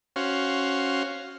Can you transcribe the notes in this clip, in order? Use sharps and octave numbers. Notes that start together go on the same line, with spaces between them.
C#4 F#4 C5 F5